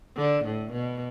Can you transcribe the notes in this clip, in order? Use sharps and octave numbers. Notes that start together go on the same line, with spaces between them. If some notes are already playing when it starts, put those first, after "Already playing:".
D3
A2
B2